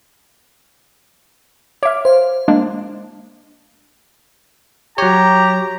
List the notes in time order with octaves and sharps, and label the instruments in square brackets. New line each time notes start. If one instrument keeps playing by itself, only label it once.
[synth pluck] C#5 E5 [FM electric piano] D6 F6
[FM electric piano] C5 F5
[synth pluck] G#3 A#3 D4
[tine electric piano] F#3 C#5 [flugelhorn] G4 [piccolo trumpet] A#5